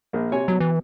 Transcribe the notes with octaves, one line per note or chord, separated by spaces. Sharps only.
A#1 A#3
C3 C#5 G#5
B2 F#3
E3